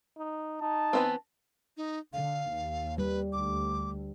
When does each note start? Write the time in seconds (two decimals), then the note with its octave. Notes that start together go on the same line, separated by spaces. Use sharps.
0.18 D#4
0.62 D#4 A5
0.93 E3 B3 C4
1.77 D#4
2.13 D3 F5
2.50 D#2
2.98 G3 B4
3.33 D2 D6